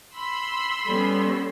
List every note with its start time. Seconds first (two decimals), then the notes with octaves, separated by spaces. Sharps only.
0.14 B5 C6 E6
0.85 G3 B3 C#4 A4